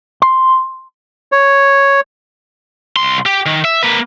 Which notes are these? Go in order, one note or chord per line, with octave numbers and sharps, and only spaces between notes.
C6
C#5
C2 C6
G4
D#3
E5
A#3 B4